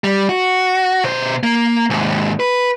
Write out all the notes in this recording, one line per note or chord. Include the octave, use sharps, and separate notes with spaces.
G3
F#4
B2 C5
A#3
D#2 G#2
B4